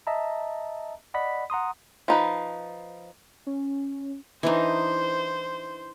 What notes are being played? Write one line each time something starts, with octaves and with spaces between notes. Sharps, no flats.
D#5 E5 A5 A#5
D5 D#5 F#5 B5 B6
F#5 A#5 C6 D#6
F3 D#4 B4
C#4
E3 D4 D#4 C5